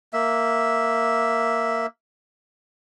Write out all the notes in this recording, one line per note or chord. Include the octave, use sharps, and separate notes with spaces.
A#3 E5